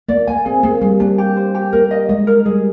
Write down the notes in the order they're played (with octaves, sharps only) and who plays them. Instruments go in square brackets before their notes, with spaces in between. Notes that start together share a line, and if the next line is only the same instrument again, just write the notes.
[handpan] A#3 [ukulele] D5
[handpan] A#3 [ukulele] G#5
[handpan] C4 [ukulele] G#4
[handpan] A#3 [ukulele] G#4
[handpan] G3 [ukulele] G#4
[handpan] A#3 [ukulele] D4
[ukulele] G4
C5
G4
[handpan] A#3 [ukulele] A#4
[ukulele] D#5
[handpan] G#3 [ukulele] D#5
[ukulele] A#4
[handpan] G3 [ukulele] G#4